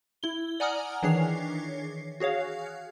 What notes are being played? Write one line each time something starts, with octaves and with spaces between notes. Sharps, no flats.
E4 G7
D5 F#5 G#5 A#5 D#6 F6
D#3 E3 D4 G#4 C#5 C7
F#4 G#4 C#5 F5